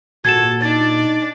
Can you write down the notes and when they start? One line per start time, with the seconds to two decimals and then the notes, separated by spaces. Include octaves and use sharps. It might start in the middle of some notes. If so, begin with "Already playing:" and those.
0.25 G#1 A#2 F#4 A4 G#6 E7
0.62 D4 D#4 D5 A6